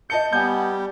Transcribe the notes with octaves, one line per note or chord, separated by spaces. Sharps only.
D#5 A5 G6 C#7
G3 B3 G#5 G6